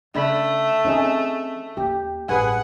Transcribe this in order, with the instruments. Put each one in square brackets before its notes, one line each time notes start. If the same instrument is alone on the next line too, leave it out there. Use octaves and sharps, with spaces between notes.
[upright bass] C#3 [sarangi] A3 [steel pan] D4 B5
[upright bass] E3 C4 [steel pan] C#4 D#4 G#4
[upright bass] D#2 A#3 [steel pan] G4
[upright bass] A1 G2 [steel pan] G#4 B4 G#5 [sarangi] F#5